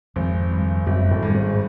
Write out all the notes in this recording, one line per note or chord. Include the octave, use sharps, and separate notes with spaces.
G#1 F2
G2
G#1 F#2
A2
G2
G#2